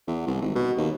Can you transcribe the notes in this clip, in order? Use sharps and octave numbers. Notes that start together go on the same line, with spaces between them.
E2
C2
G#1
B2
D#2